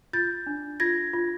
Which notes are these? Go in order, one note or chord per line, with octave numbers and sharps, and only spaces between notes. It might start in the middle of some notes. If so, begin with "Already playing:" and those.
F4 G6 A6
D4
F4 G#6 A#6
F4